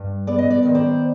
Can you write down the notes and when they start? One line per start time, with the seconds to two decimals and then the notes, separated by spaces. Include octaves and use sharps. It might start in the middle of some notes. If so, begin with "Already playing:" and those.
Already playing: G2
0.27 B3 D5
0.38 D#5
0.50 D5
0.63 D#3 D#5
0.75 C5 D5